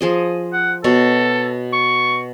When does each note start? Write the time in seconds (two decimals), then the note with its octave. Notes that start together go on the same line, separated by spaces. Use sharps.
0.01 F3 G#4 D#5
0.53 F#5
0.84 B2 A4 C#5
1.73 C#6